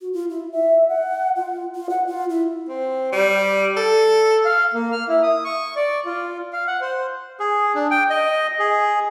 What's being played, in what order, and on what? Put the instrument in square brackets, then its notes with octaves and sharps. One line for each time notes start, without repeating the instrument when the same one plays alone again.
[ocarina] F#4
F4
E4
E5
F#5
F4
F4
F#5
F4
E4
[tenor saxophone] C4
G3
A4
[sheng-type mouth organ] F5
A#3
F6
E4
D#6
C#6
D5
F4
F5
F#5
C5
[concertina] G#4
D4
G5
D#5
G#4